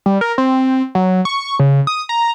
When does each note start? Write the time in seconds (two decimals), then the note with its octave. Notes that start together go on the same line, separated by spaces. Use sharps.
0.06 G3
0.21 A#4
0.38 C4
0.95 F#3
1.25 C#6
1.59 C#3
1.87 D#6
2.09 A#5